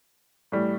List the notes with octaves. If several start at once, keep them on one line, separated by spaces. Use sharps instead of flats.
A2 E3 G3